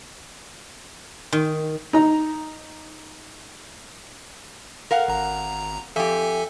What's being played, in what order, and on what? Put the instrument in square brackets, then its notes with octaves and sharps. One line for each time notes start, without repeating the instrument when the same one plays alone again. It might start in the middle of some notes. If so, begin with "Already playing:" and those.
[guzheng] D#3
[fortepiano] D#4 A#5
[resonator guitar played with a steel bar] A#4 F5 F#5
[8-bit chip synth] G#1 A#5
[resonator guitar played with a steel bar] F2 G4 [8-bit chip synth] A4 E5 G#5